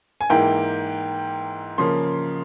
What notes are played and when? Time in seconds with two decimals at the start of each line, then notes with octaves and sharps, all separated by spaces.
0.21 G#5
0.29 G#2 E3 A#3 E4 G5
1.78 C#3 F3 A#3 C6